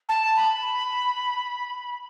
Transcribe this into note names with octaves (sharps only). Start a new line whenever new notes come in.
A5
B5